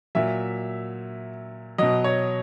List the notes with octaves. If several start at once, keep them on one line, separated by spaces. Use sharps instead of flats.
A#2 F#3 E5
B2 F#3 D#5
C#5